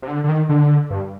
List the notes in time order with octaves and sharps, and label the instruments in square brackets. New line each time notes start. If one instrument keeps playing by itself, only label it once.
[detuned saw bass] C3
D3
D3
D#3
D3
G2